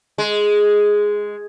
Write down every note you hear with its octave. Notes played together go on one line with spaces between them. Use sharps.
G#3